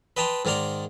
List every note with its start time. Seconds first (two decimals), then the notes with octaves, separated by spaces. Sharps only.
0.17 B4 D#5 G5 A5 A#5 C6
0.45 G#2 D#3 A#4 D5 A#5 C6